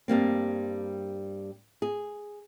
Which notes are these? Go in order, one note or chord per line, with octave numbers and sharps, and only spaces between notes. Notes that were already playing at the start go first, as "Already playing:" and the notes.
G2 G3 A#3 C4
G#4